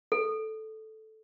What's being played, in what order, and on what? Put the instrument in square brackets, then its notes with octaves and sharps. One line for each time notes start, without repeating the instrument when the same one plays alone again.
[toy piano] A4